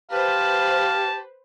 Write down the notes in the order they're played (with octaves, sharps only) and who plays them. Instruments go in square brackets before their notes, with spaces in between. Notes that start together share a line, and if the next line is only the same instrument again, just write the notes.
[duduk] G4 [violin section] B4 C5 [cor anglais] F5 [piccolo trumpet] A5